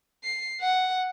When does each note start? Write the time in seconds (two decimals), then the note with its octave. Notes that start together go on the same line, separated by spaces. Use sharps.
0.24 C7
0.61 F#5